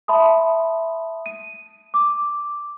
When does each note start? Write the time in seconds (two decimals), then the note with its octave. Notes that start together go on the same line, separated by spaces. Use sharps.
0.08 E5 A5 B5 C6 D#6
1.26 D#7
1.94 D6